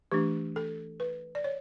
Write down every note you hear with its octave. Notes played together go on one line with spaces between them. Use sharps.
E3 A3 D4 G4
A4
B4
D5
C#5